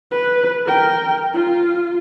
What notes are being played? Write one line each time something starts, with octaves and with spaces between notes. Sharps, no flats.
B4
A#4 G5
F4